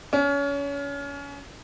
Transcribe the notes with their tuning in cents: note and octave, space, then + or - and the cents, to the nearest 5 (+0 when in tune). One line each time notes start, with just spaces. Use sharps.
C#4 +30